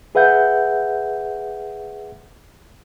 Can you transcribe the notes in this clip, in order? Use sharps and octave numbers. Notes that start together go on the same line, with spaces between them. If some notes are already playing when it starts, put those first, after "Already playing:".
G#4 B4 E5 F#5 G6